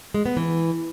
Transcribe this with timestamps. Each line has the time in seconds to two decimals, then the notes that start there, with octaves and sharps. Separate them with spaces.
0.14 G#3
0.26 B3
0.37 E3